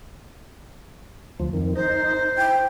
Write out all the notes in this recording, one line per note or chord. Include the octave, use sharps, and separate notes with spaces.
D2 F3
F2 D#3
D#4 C5
E4 G5